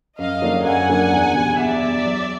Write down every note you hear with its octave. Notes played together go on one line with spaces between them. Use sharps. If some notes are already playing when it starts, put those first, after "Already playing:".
F#2 D#5 F5
D3 F#3 A#3 D4
F#2 F#5 G#5
D3 F#3 A#3 D4
E2
B2 G3
E2 D5 E5
B2 G3
F#3